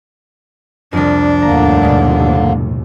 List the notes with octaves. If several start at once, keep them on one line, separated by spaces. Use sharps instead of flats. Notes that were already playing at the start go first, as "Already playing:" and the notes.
C2 F2 D4
G1 D#2 A2 D3 A#3 A#5
B2 G#3